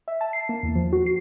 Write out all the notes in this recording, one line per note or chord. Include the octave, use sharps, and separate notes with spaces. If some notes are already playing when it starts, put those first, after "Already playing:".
E5
A5
C7
A#3
E2
F3
F#4
C7